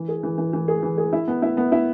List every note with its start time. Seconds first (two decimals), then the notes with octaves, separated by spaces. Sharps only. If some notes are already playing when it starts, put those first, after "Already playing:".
Already playing: E3
0.08 G#4
0.23 E3
0.38 E3
0.53 E3
0.68 G#4
0.83 E3
0.98 G#4
1.13 E4
1.28 B3
1.42 E4
1.57 B3
1.72 E4